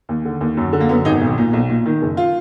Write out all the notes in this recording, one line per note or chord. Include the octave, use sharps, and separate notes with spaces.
D#2
D3
D#2
F#2
D3
A#3
F#2 B3
G#1 D#4
B1
A#2
B1
A#2
D#3
F#1
F4